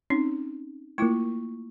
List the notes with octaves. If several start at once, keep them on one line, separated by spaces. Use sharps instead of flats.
C4 C#4 D#4
A3 A#3 E4 F4 C#6